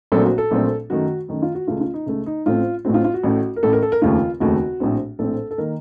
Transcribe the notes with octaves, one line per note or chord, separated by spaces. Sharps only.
A#1 A#2 F#3 A3 C4 A4
F#4
A4
A#1 A#2 F#3 A3 C4
F#2 D#3 A3 F#4
F#2 D#3 A3
F4
F#4
C#2 C#3 A3 F4
F4
D#4
C#2 C#3 A3
D#4
A1 A2 A3 C4 F4
A1 A2 A3 C4 F#4
F4
F4
F#4
A1 A2 A3
A#4
A1 A2 A3 A4
A#4
A4
A#4
F1 D#2 C#3 A3 F4
F1 D#2 C#3 A3 F#4
A#1 A2 A3 C4
A#1 A2 A3 C4 A4
A4
D#3 A#3 A#4